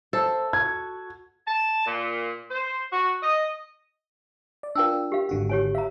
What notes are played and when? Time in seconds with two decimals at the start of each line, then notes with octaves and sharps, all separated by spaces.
0.13 A4 C5 E5
0.53 F#4 G#6
1.47 A5
1.86 A#2
2.50 C5
2.92 F#4
3.22 D#5
4.63 D5
4.75 D4 F4 A#4 G5 E6
5.12 G4 F5
5.29 G#1 D3 F#4
5.49 G4 C#5 G#5
5.75 E5 F5 A#5